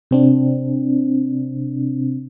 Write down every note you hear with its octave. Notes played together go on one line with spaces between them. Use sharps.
C3 C4 D4